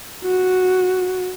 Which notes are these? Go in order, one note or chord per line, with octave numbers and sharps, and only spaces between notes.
F#4